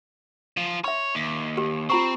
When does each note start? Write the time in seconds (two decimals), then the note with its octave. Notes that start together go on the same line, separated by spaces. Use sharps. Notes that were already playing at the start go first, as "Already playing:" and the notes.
0.57 F3 F4
0.84 C#5 E5 C6
1.15 D#2
1.57 G4
1.90 C4 F4 A#5 C#6